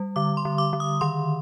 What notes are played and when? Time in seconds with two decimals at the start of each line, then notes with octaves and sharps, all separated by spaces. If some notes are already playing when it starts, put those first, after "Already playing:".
Already playing: G3
0.16 D3 D6
0.37 C6
0.45 D3
0.58 D6
0.73 D3
0.80 D#6
1.01 D#3 C6